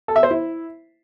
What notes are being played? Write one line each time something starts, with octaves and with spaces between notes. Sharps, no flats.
A4
E5
C5
E4